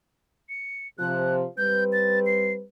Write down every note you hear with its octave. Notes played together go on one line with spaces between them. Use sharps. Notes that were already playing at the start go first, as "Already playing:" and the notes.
C#7
C3 F3 F#6
G3 C4 B4 G6
A6
C7